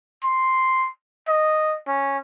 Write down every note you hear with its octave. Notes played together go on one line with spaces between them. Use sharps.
C6
D#5
C#4